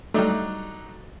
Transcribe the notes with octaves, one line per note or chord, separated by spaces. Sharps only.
F#3 G3 A3 D4 D#4